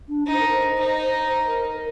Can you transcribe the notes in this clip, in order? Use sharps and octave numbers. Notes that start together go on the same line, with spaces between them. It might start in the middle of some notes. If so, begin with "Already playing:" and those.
D4
D#4
C5
A#4
C5
D#4
C5
A#4
A#4